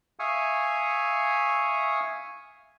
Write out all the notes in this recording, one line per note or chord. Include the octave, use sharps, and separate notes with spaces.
E5 F5 G#5 C#6 D#6